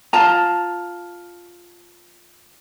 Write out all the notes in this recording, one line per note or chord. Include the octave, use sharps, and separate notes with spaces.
F4 A5 A#5